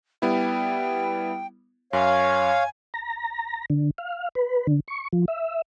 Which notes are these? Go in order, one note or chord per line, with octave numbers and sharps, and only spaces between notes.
G3 B3 E4 G5
F#2 C#5 F5 G#5
A#5
D3
F5
B4
D3
C#6
F3
E5